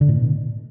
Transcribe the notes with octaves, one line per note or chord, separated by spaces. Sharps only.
D3
A2
B2